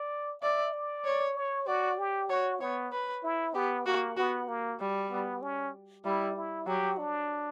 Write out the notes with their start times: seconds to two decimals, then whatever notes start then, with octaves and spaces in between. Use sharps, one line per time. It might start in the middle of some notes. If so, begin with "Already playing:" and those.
Already playing: D5
0.42 D5 E5
0.73 D5
1.05 C#5
1.36 C#5
1.67 F#4 D5
1.99 G4
2.30 F#4 C#5
2.61 B3 C#5
2.93 B4
3.24 E4
3.55 B3 G4
3.86 A#3 F#4
4.17 B3 F#4
4.48 A#3
4.79 G3
5.11 B3
5.42 C#4
6.05 G3 E4
6.36 E4
6.67 F#3 G4
6.98 D4